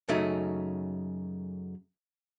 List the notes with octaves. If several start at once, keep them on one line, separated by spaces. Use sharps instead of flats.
F#2 C#3 A3 D#4